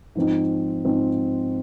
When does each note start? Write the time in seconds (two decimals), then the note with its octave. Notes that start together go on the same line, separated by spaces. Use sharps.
0.15 G#2 F3 C4 D#4
0.85 G#2 F3 C4 D#4